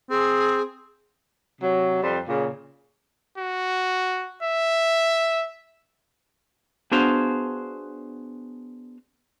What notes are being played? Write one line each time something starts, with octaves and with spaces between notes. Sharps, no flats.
C4 G#4
C3 F#3
F2 G3 C5
A#2 C#3
F#4
E5
B3 D4 F#4 G#4 C5 F5